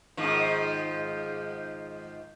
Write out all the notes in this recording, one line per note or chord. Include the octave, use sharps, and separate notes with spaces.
G#2 D#3 F3